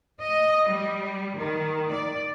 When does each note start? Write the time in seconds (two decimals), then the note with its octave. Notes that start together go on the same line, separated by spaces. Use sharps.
0.20 D#5
0.69 G3
1.38 D#3
1.92 D5